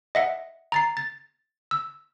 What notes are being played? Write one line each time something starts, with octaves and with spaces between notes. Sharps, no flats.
D#5 E5 F#5
A#5 A6 C7
A6
E6